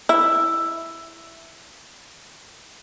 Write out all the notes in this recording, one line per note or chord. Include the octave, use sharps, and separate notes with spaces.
E4 E6